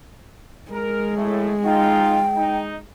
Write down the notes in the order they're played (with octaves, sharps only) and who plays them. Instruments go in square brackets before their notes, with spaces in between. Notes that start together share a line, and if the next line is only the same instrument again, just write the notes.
[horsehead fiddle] G#3 [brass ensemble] A#4
[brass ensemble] A2 A3
[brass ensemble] D#4 F4 [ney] G5
[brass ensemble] D#4